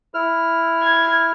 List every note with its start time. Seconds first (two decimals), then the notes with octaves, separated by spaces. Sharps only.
0.14 E4 F6
0.83 G#6